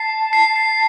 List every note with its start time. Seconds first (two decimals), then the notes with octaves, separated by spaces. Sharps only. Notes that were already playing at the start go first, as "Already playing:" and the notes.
Already playing: A5 C7
0.33 C7
0.56 C7